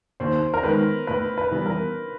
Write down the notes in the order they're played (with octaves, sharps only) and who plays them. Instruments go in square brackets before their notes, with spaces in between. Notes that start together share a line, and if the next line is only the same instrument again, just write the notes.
[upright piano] D#2 [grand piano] C5
[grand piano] A#4
[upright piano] D#3 G#3 B3 [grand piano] B4
[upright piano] A2 [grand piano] B4
[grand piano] B4
[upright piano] E3 G3 B3 E4
[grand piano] A#4